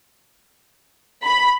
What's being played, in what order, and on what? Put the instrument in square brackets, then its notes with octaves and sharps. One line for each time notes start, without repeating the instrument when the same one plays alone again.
[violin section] B5